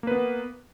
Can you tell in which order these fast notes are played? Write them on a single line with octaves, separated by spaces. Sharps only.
A#3 B4 B3